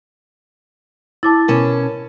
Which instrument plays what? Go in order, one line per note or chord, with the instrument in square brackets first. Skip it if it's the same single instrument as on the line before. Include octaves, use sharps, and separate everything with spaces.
[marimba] E4 [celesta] A5 D6 A6
[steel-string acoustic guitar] B2 C#4 A5 [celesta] A#4